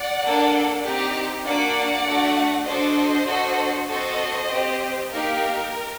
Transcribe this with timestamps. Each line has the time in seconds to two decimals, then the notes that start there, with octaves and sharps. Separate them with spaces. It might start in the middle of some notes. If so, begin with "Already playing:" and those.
Already playing: D5 F#5
0.24 A#3 D4 A4
0.84 C4 D#4 G4
1.45 A#3 D4 F#4 D5 F#5
2.06 A3 D4 F#4
2.66 D4 F#4 A4 C5 D#5
3.27 D4 F#4 A4
3.88 C4 F#4 A4 C5 D#5
4.49 C4 G4
5.09 A#3 D#4 G4 A#4